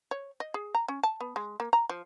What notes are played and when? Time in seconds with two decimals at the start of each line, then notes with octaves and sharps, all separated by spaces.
0.11 C#5
0.40 D#5
0.54 G#4
0.75 A#5
0.88 C#4
1.03 A5
1.21 B3
1.36 G#3
1.60 A#3
1.73 A#5
1.89 F3